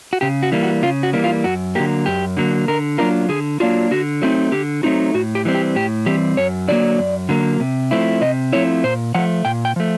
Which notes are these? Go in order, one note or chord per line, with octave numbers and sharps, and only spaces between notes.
F#4
C#3 G4
F#4
E3 G3 A#3
F#4
C#3 F4
F#4
E3 G3 A#3
F4
F#2 F#4
D3 F#3 A#3 G4
F#2 G4
D3 F#3 A#3
D3 A#4
F#3 A#3 D4 F4 A#4
D3 G#4
F#3 A#3 D4 F4 F#4
D3 F#4
F#3 A3 C4 D#4
D3 G4
F#3 A3 C4 D#4 F#4
A2 F#4
G4
E3 G3 C4
G4
A2 G4
E3 G3 C4 G4
F#2 C#5
D3 F#3 A#3 D5
F#2
D3 F#3 A#3
C3
F3 A3 C4 E4
C3 D#5
F3 A3 C4 E4 C#5
A#2 C5
F3 A3 F#5
A#2 G5
G5
F3 A3